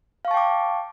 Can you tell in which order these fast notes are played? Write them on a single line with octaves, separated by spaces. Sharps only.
F5 C#6 A5 G5 D6